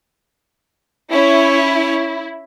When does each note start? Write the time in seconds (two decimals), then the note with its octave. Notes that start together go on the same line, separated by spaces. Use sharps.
1.12 C#4 E4 C#5